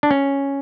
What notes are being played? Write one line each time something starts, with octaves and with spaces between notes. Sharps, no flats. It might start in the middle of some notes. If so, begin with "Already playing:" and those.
D4
C#4